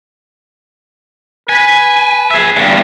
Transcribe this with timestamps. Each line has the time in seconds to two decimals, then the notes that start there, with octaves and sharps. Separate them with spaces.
1.49 B4 G#5
2.31 G#4 E5
2.56 E2 G2